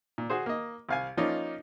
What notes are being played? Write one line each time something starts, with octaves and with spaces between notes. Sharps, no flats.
A#2
F#4 G#4 C5
A#3 D#5
C2 F5 G#5
F3 A#3 C#4 D#4 F4 D5